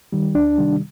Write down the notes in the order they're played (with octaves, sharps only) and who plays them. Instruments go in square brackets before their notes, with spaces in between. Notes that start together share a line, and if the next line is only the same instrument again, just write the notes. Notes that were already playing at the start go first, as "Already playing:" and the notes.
[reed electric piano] D#3 G3
D2 D4
C3 D#3 G3